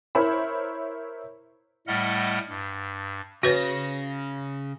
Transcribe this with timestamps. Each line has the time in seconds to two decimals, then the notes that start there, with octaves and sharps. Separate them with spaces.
0.15 E4 A#4 C5 C#5 E5 B5
1.87 A2 G3 A3 D#5 F#5 F6
2.49 G2
3.43 C#3 F#4 B4 C#5 A#6